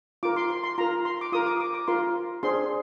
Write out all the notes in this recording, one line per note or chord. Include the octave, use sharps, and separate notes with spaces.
F4 A#4 D6
C6
C6
C6
F4 A#4 A#5
C6
D6
F4 A#4 D#6
D6
D6
D6
F4 A#4 C6
D4 G#4 C5 C6